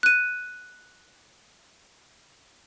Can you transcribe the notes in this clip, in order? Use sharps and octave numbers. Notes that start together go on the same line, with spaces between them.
F#6 D#7